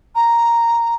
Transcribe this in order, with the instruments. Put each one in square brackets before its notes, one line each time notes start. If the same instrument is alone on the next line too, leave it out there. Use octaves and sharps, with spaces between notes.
[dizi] A#5